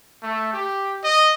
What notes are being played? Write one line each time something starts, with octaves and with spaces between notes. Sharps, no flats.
A3
G4
D#5